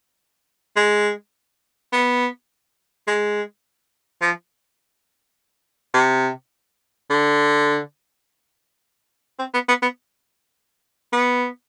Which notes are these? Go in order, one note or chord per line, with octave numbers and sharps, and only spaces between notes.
G#3
B3
G#3
F3
C3
D3
C4
B3
B3
B3
B3